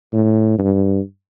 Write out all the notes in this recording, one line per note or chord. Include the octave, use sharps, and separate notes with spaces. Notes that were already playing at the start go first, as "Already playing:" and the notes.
A2
G2